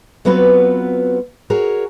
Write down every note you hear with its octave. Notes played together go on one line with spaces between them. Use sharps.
F#3 B3 C4 F4 F#4 B4
F#4 G#4 A#4 C#5